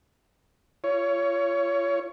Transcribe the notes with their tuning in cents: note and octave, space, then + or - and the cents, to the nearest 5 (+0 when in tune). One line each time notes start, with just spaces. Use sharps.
F4 -30 C#5 +15